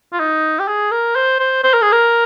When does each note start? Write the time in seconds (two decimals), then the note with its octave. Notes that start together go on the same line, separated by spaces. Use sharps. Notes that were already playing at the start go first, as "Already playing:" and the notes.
0.13 F4
0.19 D#4
0.59 G4
0.68 G#4
0.91 A#4
1.15 C5
1.39 C5
1.63 C5
1.73 A#4
1.82 G#4
1.92 A#4